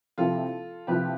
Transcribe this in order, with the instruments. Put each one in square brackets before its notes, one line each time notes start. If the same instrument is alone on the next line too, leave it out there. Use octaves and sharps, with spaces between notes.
[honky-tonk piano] C3 F3 C4 E4 [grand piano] F4 A4
[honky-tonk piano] C3 F3 C4 E4 [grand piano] G4 B4